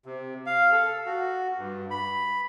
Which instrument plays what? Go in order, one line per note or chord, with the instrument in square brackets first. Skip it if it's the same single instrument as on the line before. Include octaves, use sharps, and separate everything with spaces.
[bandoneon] C3
F5
A4
F#4
G2
B5